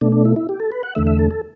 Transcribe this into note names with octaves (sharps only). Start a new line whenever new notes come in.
B2 A3 D4
D4
E4
E4
G4
A4
B4
F#5
E2 D3 A3 E5
E5
A4
A4